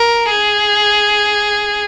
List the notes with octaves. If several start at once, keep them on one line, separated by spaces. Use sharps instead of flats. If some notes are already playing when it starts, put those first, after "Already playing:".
Already playing: A#4
G#4